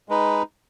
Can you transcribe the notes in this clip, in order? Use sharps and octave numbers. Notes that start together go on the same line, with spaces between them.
G#3 D#4 B4